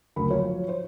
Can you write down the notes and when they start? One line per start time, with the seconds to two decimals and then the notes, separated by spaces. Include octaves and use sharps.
0.16 F#1 D2 A#4 B5
0.30 F3 F#3 F4 C#5
0.68 C5 C#5